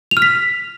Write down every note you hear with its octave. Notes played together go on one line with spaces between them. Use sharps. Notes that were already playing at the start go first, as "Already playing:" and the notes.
F7
F6
B6